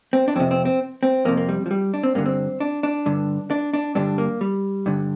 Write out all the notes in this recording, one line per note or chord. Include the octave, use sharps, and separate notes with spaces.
C4
D4
F2 C3 C4
C4
C4
C4
F2 C3 A#3
A#3
G3
F3
G3
D4
C4
G2 D3 A#3
C4
D4
D4
G2 D3
D4
D4
G2 D3 D4
A#3
G3
G2 D3